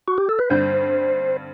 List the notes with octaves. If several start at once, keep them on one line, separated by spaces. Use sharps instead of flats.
F#4
G4
A4
B4
G2 D3 G3 C4 C5